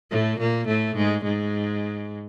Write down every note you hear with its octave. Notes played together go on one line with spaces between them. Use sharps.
A2 A3
A#2 A#3
A2 A3
G#2 G#3
G#2 G#3